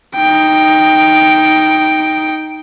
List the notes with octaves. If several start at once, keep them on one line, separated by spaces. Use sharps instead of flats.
D#4 G5